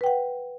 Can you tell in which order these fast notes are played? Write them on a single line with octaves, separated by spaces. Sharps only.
B4 G5 F#5